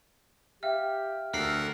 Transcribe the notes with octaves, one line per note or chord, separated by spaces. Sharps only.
G4 E5 F5 G5 F6
D2 A4 A#4 F#5 F6 C7